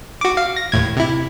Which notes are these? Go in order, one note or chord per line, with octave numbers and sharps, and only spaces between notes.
F#4 D6
F5
A#6
D#2 A2 G#6
C3 E4